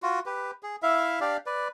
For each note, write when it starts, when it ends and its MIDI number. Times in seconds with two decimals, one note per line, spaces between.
0.03 0.20 65
0.03 0.20 66
0.26 0.51 67
0.26 0.51 71
0.63 0.76 68
0.83 1.20 64
0.83 1.20 76
0.83 1.20 77
1.21 1.37 62
1.21 1.37 67
1.21 1.37 74
1.21 1.37 77
1.46 1.68 71
1.46 1.68 74